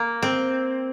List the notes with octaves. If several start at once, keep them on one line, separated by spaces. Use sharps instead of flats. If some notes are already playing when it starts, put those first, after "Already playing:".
Already playing: A#3
C4